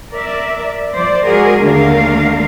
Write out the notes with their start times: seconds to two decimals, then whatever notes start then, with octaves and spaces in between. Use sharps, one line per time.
0.11 A#4 D5 E5
0.95 F3 C5 D5
1.25 G#3 F#4 G#4 A#4
1.62 D#2 D3 A3 D4 A#4 F5